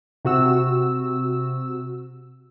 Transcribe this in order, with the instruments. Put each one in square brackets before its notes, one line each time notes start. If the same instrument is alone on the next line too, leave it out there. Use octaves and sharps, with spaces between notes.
[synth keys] C3 F#4 E6